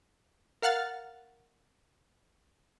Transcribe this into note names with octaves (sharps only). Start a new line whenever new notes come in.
A#4 F5 F#5 F6 A6